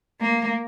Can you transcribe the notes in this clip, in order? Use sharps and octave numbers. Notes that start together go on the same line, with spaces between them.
A#3